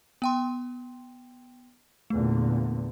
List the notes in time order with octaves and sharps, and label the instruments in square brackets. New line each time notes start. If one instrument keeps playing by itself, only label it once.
[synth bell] B3 G5 C6
[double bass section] E2 A#2 D3 [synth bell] A3